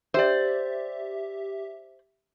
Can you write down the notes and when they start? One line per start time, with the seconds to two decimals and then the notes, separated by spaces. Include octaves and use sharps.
0.14 G4 C5 D5 E5